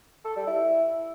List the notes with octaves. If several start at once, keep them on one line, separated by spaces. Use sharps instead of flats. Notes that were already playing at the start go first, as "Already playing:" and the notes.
A4
G3
E4